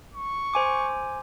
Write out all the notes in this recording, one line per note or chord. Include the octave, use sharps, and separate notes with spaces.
C#6
C5 G#5 D6